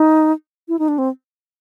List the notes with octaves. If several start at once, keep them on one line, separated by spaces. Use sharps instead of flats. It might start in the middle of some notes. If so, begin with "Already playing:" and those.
Already playing: D#4
E4
D#4
D4
C4